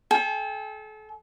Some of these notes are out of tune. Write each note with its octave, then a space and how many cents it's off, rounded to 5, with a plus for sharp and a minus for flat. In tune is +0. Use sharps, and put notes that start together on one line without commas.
A4 -40 G5 +35